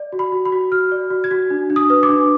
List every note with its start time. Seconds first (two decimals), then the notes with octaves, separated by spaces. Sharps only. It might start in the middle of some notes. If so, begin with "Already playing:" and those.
Already playing: D5
0.12 F#4
0.19 B5
0.32 F#4
0.45 B5
0.52 F#4
0.72 F#4 F6
0.92 D5
1.10 F#4
1.24 G#6
1.31 F#4
1.50 D4
1.70 D4
1.76 D#6
1.90 B4
2.03 D6
2.09 D4